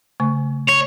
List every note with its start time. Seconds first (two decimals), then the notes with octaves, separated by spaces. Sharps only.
0.20 C#3 A3 C#6
0.68 C#5